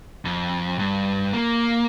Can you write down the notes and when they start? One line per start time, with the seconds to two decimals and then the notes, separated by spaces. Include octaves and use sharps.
0.25 F2
0.79 G2
1.33 A#3